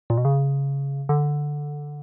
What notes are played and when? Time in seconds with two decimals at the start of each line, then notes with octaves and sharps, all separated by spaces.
0.10 A#2
0.18 B2
0.25 C#3
1.09 D3